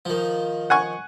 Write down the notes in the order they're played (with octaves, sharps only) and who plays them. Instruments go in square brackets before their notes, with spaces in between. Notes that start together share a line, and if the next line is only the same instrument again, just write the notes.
[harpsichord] D#3 F3
[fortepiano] F#5 G#5 C#6